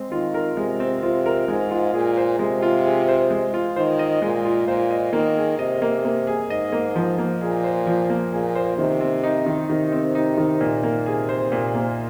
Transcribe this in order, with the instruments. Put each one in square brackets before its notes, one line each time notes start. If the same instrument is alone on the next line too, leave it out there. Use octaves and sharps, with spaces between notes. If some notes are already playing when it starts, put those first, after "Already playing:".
Already playing: [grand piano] G#3 C4
[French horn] D#3 [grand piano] F4
[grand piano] A#4
[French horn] C3 [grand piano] G#3
[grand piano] C4
[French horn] C3 [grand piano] F4
[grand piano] A#4
[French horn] G#2 [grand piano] G#3
[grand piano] F4
[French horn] A#2 [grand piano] G#4
[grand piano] C5
[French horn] C3 [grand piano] G#3
[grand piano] F4
G#4
C5
G#3
F4
[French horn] D#3 [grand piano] C5
[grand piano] D#5
[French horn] A#2 [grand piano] G#3
[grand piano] F4
[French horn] A#2 [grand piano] C5
[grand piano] D#5
[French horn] D#3 [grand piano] A#3
[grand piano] G#4
[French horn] C3 [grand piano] D#5
[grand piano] A#3
A#3
G#4
[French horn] G#2 [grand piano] D#5
[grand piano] A#3
F3
A#3
[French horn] A#2 [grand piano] G#4
[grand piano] C5
F3
A#3
[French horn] A#2 [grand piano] G#4
[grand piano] C5
[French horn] C3 [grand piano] D#3
[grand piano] C4
D#4
D#3
[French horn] C3 [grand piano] D#3
[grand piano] C4
D#4
D#3
A#2
A#3
[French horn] C3 [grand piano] G#4
[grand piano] C5
A#2
A#3